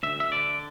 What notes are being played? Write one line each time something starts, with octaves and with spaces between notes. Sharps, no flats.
D2 E5
E5
D3 D5